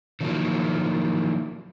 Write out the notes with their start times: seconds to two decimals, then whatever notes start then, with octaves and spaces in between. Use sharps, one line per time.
0.21 D#3 F3 F#3 A#3